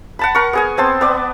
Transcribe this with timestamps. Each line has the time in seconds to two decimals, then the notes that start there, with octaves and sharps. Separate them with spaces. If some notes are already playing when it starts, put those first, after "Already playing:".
0.19 F#5 A5 B5
0.35 A#4 F#5 C#6
0.53 B3 G#4 G#5
0.77 B3 C4 A5 C6
1.01 B3 D5